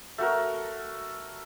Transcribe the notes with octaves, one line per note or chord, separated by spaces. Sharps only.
A3 F#4 A#4